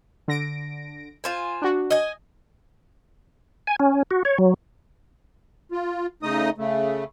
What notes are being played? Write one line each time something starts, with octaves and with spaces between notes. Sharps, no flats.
D3 A#6 D7
F4 C5 G#5
D4 F#4
D#5 G#5
G#5
C#4
F#4
C#5
F#3
F4
C#3 A3 D#4 D#5 D#6
C#3 A3